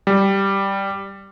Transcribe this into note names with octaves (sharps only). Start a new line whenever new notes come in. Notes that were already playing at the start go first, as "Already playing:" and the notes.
G3